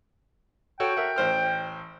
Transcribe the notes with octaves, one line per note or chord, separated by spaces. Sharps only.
F#4 A4 C#5 G5
A#4 E5 F#5
A1 C5 F6